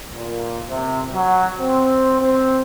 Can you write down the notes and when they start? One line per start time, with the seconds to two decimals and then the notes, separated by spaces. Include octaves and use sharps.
0.12 A#2
0.69 C3
1.12 F#3
1.59 C4
2.20 C4